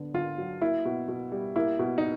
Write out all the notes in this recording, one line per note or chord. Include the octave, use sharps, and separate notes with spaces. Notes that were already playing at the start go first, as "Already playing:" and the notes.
Already playing: D3 B3
D3 F4
F#3
A#3 E4
B2
B2
G3
A#3 E4
B2
D#4